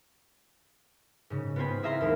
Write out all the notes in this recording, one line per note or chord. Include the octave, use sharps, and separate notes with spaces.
G#2 C#3
B3 C4 F4 C5 G#5 B5
E4 G#4 E5 F5 A#5 C6
D#2 G#3